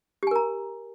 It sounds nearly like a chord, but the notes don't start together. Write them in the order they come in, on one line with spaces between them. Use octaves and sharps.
G4 G#5 A#4 A#5